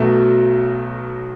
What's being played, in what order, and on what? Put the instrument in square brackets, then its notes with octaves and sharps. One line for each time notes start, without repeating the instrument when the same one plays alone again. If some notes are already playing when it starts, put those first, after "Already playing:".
Already playing: [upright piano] B1 B2 F#3 A3